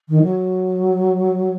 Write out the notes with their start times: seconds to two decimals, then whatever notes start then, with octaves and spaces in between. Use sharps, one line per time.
0.09 D#3
0.23 F#3